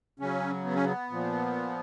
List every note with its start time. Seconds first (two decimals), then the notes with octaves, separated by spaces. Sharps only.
0.20 C#3 F#3 C#4
0.65 B3
0.75 C#4
0.84 B3
1.10 A#2 F3